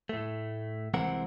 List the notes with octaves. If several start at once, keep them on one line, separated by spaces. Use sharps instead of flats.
A2 A3
C2 E3 G#3 C4 A#4 F#5